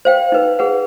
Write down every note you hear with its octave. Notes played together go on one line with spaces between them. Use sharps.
C5 F5 G5
D#4 B4
G#4 B4 F#5